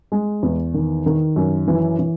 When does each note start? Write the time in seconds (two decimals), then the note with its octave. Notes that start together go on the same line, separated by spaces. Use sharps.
0.12 G#3
0.43 E2
0.74 D#3
1.06 D#3
1.36 F#2
1.68 E3
1.99 E3